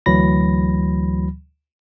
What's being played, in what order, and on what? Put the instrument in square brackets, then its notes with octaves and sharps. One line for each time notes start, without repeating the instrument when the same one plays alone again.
[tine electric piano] D2 E3 F#3 B5 A#6